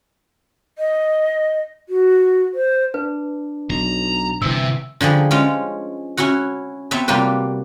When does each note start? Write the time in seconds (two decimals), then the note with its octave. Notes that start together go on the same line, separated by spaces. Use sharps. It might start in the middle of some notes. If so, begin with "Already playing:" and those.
0.78 D#5
1.89 F#4
2.54 C5
2.94 D4 B4
3.70 B1 A#5
4.42 G1 C3 E3 E6
5.01 D3 F3 G3 G#4
5.31 F3 G#3 C#4 F4
6.17 C#4 E4 F#4 F#5
6.91 B3 C4 C#5 E5 A5
7.08 C3 G3 A#3 F4 F#4 B4